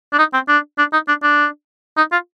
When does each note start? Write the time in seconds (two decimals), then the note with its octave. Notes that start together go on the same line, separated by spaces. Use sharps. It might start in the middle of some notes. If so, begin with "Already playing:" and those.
0.13 D4
0.19 D#4
0.33 C4
0.49 D4
0.78 D4
0.93 D#4
1.08 D4
1.23 D4
1.97 D#4
2.12 F4